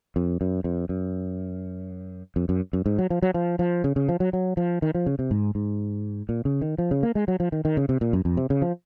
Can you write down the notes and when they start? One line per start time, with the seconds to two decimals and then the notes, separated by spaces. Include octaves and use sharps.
0.16 F2
0.41 F#2
0.64 F2
0.89 F#2
2.36 F2
2.49 F#2
2.73 F#2
2.86 G#2
2.99 F#3
3.10 F3
3.22 F#3
3.34 F3
3.59 F3
3.84 C#3
3.96 C#3
4.09 F3
4.20 F#3
4.33 F#3
4.57 F3
4.82 D#3
4.95 F3
5.06 C#3
5.19 C3
5.31 G#2
5.55 G#2
6.29 A#2
6.45 C#3
6.62 D#3
6.78 F3
6.91 C#3
7.03 A#3
7.15 G#3
7.28 F#3
7.40 F3
7.52 D#3
7.65 D#3
7.77 C#3
7.89 C3
8.01 A#2
8.13 F#2
8.25 F2
8.37 C3
8.50 C#3
8.62 F3